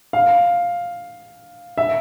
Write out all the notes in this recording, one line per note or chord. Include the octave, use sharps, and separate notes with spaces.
F5
E5